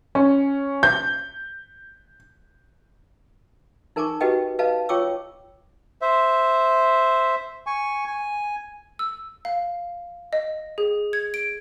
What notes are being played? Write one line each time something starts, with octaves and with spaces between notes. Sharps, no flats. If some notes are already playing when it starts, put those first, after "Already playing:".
C#4
G6
D#4 A#4 G#5 A5 C#6 D6
F#4 G4 B4 D#5 G5
B4 D#5 F5 A5
F4 C#5 G5 C#6 D6 E6
C5 E5
G#5 C#6
G#5
E6
F5
D#5
G#4
G#6
D7